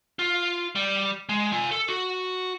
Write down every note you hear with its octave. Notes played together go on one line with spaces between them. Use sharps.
F4
G3
G#3
F4 G#5
A4
F#4